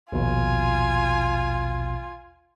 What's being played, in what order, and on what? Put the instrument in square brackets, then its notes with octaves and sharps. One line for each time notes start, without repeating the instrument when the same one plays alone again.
[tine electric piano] A#1 D#2 B2 [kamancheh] F4 G#5